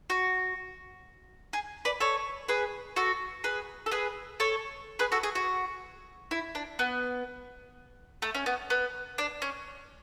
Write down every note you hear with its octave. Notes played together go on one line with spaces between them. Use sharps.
F#4
G#4
B4 D5
A4 C#5
G#4 B4
F#4 A4
G#4 B4
A4
G#4 B4
A4 C#5
G#4 B4
F#4 A4
G#4
F#4
E4
D4
B3
A3
C#4
B3
B3
D4
C#4